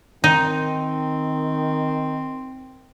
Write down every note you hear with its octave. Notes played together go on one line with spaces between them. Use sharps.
D#3 C4 D#4